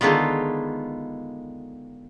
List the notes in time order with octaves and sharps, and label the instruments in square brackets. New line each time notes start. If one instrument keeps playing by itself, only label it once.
[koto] D3 D#3 G#3 B3 F4